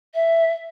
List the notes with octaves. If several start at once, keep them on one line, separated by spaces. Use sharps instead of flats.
E5